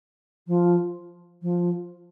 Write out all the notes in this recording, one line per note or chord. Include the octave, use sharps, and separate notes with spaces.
F3
F3